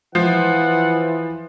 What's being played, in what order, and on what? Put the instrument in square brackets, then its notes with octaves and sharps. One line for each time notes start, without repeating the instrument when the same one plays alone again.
[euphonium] E3 [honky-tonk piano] F3 [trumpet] F#5